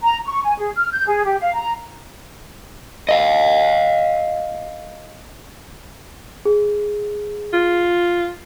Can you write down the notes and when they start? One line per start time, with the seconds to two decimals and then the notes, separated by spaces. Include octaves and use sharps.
0.03 A#5
0.25 C#6
0.43 G#5
0.58 G#4
0.75 F6
0.92 G6
1.07 G#4
1.25 G4
1.40 F5
1.54 A#5
3.09 D#5 F5
6.46 G#4
7.53 F4